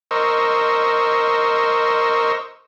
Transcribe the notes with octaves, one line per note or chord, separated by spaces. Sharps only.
A#4 C5 D#5 C#6 E6